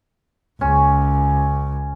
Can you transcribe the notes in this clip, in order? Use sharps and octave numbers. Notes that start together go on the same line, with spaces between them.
C#2 C#4